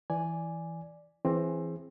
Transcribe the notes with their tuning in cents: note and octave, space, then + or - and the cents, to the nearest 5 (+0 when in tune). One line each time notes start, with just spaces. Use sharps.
E3 +0 D5 +0 G#5 +0
E3 +20 C4 +20 G#4 +0